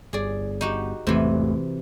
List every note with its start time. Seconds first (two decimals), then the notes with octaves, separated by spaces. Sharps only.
0.13 G1 G#4 D5
0.61 D#4 F#4 G4
1.07 G#1 E2 C3 E3 A3